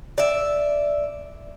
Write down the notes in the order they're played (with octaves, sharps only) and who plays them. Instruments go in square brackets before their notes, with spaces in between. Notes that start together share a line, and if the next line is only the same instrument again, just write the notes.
[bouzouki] D5 E5